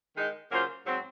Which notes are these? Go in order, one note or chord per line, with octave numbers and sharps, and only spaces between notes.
D#3 G#3 D#4
C#3 F#3 A#3 F4 C5
G#2 F#3 C4